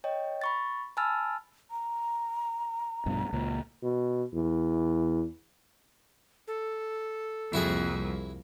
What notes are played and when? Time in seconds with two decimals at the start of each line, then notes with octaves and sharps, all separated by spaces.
0.04 C#5 D#5 G5
0.42 B5 C#6 A6
0.97 G#5 A5 B5 E6 F6 A6
1.71 A#5
3.06 A#1 G2 B2
3.33 C#2 A#2
3.83 B2
4.34 E2
6.47 A4
7.53 C2 F2 A#3 E4 F#4 G#4